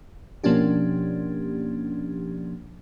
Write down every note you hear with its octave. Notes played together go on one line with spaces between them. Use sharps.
B2 F3 A#3 C#4 D4 G4